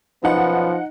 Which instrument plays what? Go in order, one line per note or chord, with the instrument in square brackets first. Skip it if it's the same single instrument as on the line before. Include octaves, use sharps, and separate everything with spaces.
[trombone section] F#2 B2 B3 [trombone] F3 [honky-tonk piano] D#4 F#5